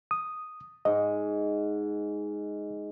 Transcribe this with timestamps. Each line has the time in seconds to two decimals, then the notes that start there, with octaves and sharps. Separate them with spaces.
0.11 D#6
0.85 G#2 D#5